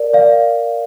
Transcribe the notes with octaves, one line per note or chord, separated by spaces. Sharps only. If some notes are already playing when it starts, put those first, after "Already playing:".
Already playing: A#4 D5
D5 F5